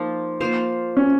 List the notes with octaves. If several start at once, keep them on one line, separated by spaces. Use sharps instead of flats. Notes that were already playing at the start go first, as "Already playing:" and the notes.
Already playing: F3 A#3 D#4 F4
A#3 F4 C5 F5
C#4